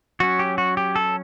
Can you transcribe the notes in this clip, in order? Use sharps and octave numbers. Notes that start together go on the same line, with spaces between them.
F#3 C#4 F#4
G4
F#4
G4
A4